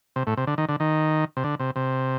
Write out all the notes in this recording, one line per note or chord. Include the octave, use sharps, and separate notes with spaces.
C3
A2
C3
D3
D#3
D3
D#3
C3
D3
C3
C3